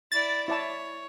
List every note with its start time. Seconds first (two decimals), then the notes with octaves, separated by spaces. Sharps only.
0.12 E4 D5 A6
0.48 E4 C#5 D5 A5